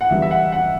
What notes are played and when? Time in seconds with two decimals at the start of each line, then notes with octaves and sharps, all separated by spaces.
0.01 F#5
0.10 E2 D3 G3 B3 E5
0.22 E5
0.31 F#5
0.52 F#5